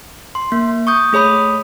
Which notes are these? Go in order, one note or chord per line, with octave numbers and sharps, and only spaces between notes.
C6
A#3
C#6 D#6 G6
A3 G#4 C#5 B5 D#6